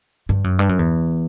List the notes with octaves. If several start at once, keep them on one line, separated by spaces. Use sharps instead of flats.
G2
F#2
G2
F#2
E2